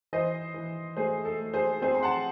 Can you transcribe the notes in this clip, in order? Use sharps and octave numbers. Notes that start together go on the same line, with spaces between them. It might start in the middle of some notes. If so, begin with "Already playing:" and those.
E3 C5 D#5
E3
A3 G#4 C5
A4
A3
G#4 C5
C4 G#4 C5
C6
F#5 A5